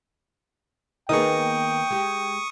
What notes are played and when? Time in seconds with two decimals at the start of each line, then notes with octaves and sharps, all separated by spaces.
1.09 D#3 A#3 B3 D#4 G#4 G5 C#6 D#6
1.90 G#3 G4